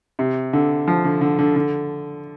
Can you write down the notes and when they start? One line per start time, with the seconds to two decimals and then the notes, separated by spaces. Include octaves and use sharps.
0.19 C3
0.53 D3
0.88 F3
1.05 D3
1.21 D3
1.39 D3
1.56 D3